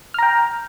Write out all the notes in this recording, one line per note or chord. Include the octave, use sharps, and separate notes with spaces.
G5 A#5 F6